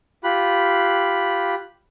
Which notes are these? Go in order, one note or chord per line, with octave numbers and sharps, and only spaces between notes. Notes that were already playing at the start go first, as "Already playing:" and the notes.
F4 G4 B5 F#6